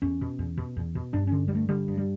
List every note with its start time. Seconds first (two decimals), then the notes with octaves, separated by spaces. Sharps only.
0.02 E2 C#4
0.21 B2
0.39 E2
0.58 B2
0.77 E2
0.95 B2
1.13 G2 D4
1.27 D3 C#4
1.48 G3
1.51 G2 A3
1.69 D3 G3
1.88 G2
1.98 G3